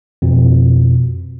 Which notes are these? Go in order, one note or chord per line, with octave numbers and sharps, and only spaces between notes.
F2 B2